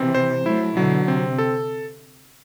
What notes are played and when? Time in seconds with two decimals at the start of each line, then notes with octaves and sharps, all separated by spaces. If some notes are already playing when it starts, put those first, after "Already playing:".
Already playing: C3 E3 C4
0.15 C5
0.45 F#3 A3 E4
0.76 B2 D3 F#3
1.08 C3 C4
1.38 A4